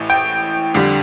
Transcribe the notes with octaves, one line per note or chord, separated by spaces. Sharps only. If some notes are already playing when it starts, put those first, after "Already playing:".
Already playing: A1 A2 E3
G5
F2 D3 G3